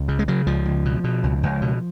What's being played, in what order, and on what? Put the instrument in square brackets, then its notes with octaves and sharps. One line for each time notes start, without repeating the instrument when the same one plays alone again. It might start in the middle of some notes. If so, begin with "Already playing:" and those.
Already playing: [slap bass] C#2
C#3
G#3
C#3 F#3
C#2 F3
C#2
B2
B2
C#2
C#2
B2